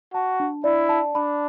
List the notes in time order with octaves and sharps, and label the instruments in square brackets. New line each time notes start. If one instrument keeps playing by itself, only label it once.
[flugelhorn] F#4 [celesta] A5
[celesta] D4
[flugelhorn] E4 [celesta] D5
[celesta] A5
[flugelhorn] D4 [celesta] B5